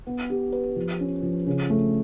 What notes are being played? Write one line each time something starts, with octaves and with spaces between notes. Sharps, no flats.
B3
G4
B4
F3
C#4
F3
C#3
A3